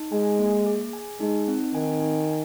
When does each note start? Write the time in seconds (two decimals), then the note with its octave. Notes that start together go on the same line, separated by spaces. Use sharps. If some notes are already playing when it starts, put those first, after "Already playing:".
Already playing: D#4
0.12 G#3 G#5
0.39 A#3
0.66 G#4
0.93 G#5
1.20 G#3 D#4
1.48 C4
1.74 D#3 G#5
2.02 G#5
2.29 G#5